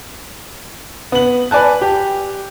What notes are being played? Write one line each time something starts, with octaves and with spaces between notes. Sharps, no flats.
B3 F#7
B4 D5 G#5 A5 F#6
G4